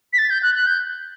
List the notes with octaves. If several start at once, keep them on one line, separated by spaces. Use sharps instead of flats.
B6
A6
G6
F#6
F#6
G6